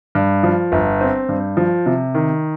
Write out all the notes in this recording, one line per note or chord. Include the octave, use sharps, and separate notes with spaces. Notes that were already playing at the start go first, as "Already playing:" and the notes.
G2
F3
G1
C4
G2
F3
C3
D#3